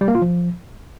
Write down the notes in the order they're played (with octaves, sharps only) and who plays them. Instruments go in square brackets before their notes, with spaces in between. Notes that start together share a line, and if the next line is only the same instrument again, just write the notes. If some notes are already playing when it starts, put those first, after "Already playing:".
[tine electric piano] G3
A#3
F4
F3